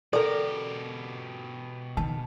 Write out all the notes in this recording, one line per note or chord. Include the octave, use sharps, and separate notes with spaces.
B2 G4 A4 A#4 D5
D#3 A5